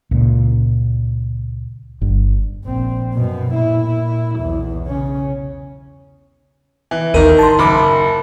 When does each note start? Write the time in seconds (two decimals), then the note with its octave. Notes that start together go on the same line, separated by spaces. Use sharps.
0.11 C#2 A#2
2.01 G1
2.65 A#1 C4
3.14 F#2 B2
3.51 A#2 E4
4.38 B1 E2
4.86 C#3 C#4
6.91 E3
7.14 A1 D#2 D#3 A#4 D#7
7.39 A5 C6
7.59 F#1 B5 D6